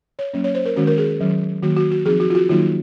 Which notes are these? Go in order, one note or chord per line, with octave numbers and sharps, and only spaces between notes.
C#5
F#3 A#3 C#4
C#5
C5
A#4
D#3 G#3 C#4 F#4
A#4
G#4
D#3 F#3 C#4
D#3 F#3 A#3 F#4
F#4
F#4
F3 C4 D#4 G#4
F#4
F4
F#4
D#3 F#3 A#3 D#4 F4